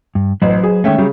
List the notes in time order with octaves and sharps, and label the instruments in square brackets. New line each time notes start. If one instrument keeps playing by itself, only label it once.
[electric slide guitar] G2
[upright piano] A1 [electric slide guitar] F#3 B4 C5
[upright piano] G#4
[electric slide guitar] D#3 G#3 A3 [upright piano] C#4 E5 G5
[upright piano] C#3 [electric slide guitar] F#3 G3